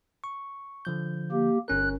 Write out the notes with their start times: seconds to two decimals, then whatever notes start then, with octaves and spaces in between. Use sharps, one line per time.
0.24 C#6
0.85 D3 F3 G6
1.32 A#3 G4
1.68 G1 C#4 A#4 F#6